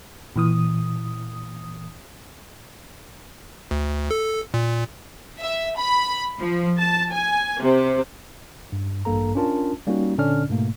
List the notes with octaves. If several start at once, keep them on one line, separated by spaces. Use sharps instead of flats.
A#2 E3 D#6
D2
A4
A#2
E5
B5
F3
A5
G#5
C3
G2
A1 G2 A#3 A4 A#5
C#4 D4 F4 A#4 A5
G3 A#3 C#4 D#4 F#4
A#2 D3 C#4 D4 D5 F6
G#2 B2 A3 A#3